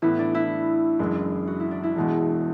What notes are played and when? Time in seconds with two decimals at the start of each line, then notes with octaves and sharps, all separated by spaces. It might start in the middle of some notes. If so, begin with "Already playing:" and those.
0.02 A2 E3 B3 E4
0.19 D4
0.35 E4
0.99 F#1 F#2 E3 G#3
1.47 F#4
1.60 E4
1.71 D4
1.83 E4
1.95 E1 E2 B2 G#3